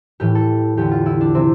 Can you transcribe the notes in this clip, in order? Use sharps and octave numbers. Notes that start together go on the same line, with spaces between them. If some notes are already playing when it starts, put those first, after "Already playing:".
A2 E3 G4
A4
E2 D3 G4
F4
E4
D4
C3 E3 C4